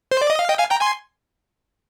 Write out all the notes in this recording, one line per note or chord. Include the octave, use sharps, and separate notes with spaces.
C5
D5
D#5
F5
D#5 G5
F5 G#5
G5 A#5
G#5 C6